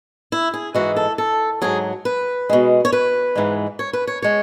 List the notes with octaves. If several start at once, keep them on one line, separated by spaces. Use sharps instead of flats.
E4
G#4
G#2 E3 G#3 F#4
A4
A4
G#2 F#3 G#4
B4
B2 G#3
C#5
B4
G#2 E3 G#3
C#5
B4
C#5
G#3 C#5